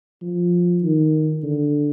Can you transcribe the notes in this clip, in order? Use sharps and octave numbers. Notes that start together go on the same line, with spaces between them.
F3
D#3
D3